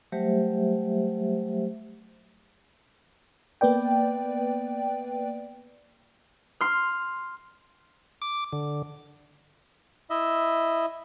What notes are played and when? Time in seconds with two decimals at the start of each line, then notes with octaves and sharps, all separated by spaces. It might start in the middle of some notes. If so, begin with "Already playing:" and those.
0.12 F#3 G3 A3 G4 C5 E5
3.61 A#3 B3 B4 D5 G5
6.61 C6 F6
8.22 D6
8.53 D3
10.10 E4 D#5 E5